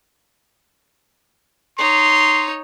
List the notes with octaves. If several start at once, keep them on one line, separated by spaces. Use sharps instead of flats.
D#4 C#5 C6